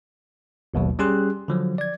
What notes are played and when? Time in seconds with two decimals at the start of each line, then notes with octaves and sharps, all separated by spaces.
0.74 A1 D#2 B2 F#3
0.99 G3 C#4 G4 G#4 C6 F#6
1.48 D3 F3 F#3
1.78 D5 G#6